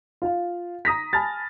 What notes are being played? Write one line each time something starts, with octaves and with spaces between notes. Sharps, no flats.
F4 F5
A#5 D#6 A#6 B6
G#5 A5 B5 F6 A6